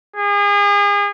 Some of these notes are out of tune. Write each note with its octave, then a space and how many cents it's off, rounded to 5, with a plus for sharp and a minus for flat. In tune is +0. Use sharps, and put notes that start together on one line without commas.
G#4 -35